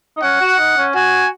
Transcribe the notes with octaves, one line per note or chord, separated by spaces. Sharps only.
D#4
C#4 F#5
F#4
D#4
C#4
F#4 G#5